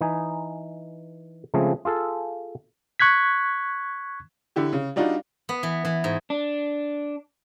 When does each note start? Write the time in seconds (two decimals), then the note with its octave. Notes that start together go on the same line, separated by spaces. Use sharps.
0.01 E3 D#4 G#5
1.54 C#3 F3 G#3 A3 C4 G#4
1.85 F4 G#4 A4 F5
3.00 C#6 F#6 G#6 B6
4.56 D3 E4 G4
4.73 C#3
4.96 G3 D4 D#4 F4 F#4
5.49 B3
5.63 E3
5.85 E3
6.04 G#2
6.30 D4